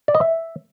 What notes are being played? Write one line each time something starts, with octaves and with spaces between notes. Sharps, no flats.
D5
D#5
E5